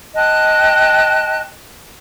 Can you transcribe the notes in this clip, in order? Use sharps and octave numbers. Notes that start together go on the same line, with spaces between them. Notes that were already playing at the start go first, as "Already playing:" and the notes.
D#5 G5 A5 F#6